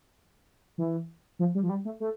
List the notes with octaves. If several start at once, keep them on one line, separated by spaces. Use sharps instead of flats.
E3
F3
G3
F3
G3
A3
A3